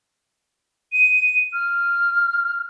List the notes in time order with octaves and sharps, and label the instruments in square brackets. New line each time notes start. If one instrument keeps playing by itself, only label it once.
[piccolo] D#7
F6